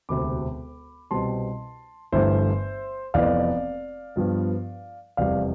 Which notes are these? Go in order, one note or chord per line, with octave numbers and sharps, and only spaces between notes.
E1 D2 C3 B5 D6
C2 B2 G3 C4 A5 C6
G1 G2 E3 A3 C5 E5
F1 F2 E3 B3 D5 F5
G2 F3 B3
F1 E2 C3 G3 D5 F5